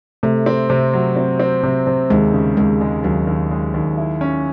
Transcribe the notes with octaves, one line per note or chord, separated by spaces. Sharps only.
C3 A3
C4
C3
F#3
C4
C4
C3
C3
D#2 G#3
C#3
D#2 G#3
G#3
D#2 F#3
D#2
G#3
D#2
E4
C#4